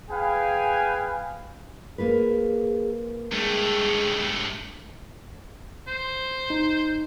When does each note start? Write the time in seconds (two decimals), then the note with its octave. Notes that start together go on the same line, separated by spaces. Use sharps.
0.10 G#4 B4 F5 G5 G#5
1.98 A#3 F4 G#4 B4
3.32 G2 G#3 A3
5.88 C5
6.50 D#4